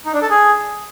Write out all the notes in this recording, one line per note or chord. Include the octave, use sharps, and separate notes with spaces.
D#4
D4
A4
G#4